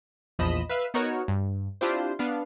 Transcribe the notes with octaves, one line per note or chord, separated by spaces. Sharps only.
A#1 E2 F3 D#5 B5 E7
B4 E5 F5
B3 D#4 F#4 A#4 C#5
G2
C4 D4 E4 F4 G4 C5
B3 D4 F5